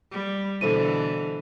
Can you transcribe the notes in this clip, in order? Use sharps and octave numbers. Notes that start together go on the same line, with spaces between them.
G3
B2 D3 E3 A4 C5 D#7